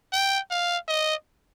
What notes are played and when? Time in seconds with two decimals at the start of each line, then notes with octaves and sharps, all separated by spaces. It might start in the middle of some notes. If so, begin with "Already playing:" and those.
0.13 G5
0.51 F5
0.88 D#5